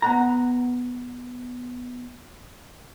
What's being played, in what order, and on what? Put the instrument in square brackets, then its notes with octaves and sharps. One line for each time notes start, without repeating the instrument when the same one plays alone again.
[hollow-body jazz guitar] B3 F#5 A#5